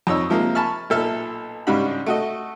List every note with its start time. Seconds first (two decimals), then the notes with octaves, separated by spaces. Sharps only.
0.07 F2 D#4 C#5 E6
0.30 C3 F3 G#3 A#3
0.55 G#5 A5 B5 C#6 F6
0.90 B1 A#2 A4 E5 E6 F6
1.67 G#2 C#3 G3 D4 F#4 B5
2.06 A3 F#4 D#5